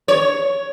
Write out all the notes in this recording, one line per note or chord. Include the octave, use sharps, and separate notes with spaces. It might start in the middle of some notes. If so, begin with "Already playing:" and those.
C#5